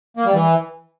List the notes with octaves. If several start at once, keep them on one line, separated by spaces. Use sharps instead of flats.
A#3
G3
E3